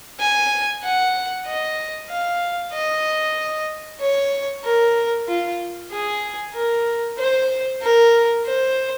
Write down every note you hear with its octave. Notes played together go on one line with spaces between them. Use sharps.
G#5
F#5
D#5
F5
D#5
C#5
A#4
F4
G#4
A#4
C5
A#4
C5